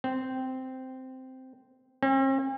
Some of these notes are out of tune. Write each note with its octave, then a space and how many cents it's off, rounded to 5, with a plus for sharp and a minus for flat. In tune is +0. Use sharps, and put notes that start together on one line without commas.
C4 -10
C4 +45